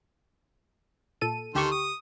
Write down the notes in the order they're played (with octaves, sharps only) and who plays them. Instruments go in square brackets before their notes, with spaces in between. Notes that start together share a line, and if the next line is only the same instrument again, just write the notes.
[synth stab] A#2 A4 D#7
[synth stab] D2 G4 C#6 [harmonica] D#3 A4 C6
[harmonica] D#6